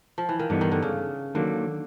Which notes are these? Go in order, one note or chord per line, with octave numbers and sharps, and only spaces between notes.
F3
E3
D#3
G2 D3 E3 G3 B3 D#4
D#3
D3
C#3
D3 D#3 F#3 A#3